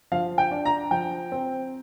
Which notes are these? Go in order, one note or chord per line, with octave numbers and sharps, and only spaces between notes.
F3 F5
G5
D4
A#5
F3 G5
C4